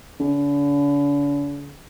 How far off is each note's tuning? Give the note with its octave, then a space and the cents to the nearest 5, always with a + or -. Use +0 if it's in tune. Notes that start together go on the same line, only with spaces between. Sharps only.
D3 -45